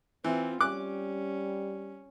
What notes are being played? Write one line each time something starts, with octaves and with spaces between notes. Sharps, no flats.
E3 C4 F4
G3 C#4 D6 F#6